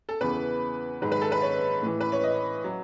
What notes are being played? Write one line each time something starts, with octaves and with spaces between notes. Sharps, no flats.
A4
E2 C#3 E3 B4
G#2 D#3 F#3 B4
B4
A4
B4
C#5
A2 E3
B4
C#5
D#5
F#3